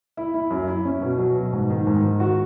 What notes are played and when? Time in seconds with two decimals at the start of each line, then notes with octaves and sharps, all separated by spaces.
0.17 E4
0.34 E4
0.51 F#2
0.68 E4
0.85 C#4
1.02 B2
1.18 F#3
1.36 B2
1.53 G#2
1.70 D#3
1.87 G#2
2.03 D#3
2.20 F#4